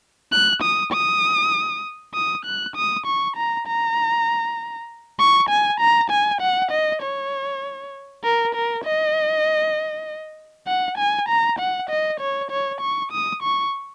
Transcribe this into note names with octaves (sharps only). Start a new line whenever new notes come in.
F#6
D#6
D#6
D#6
F#6
D#6
C#6
A#5
A#5
C#6
G#5
A#5
G#5
F#5
D#5
C#5
A#4
A#4
D#5
F#5
G#5
A#5
F#5
D#5
C#5
C#5
C#6
D#6
C#6